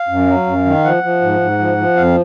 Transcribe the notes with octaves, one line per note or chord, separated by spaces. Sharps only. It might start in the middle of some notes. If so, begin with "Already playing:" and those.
Already playing: F5
F#2
F#3
F#2
D#3
F3 F#5
F3
G#2
G#2
F3
F3
F2 F5